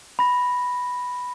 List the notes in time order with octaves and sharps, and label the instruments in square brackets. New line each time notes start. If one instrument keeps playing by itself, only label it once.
[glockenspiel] B5 A#6